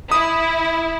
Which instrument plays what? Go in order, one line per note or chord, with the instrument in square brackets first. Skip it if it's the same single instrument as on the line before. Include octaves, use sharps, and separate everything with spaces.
[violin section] E4 [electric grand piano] D#6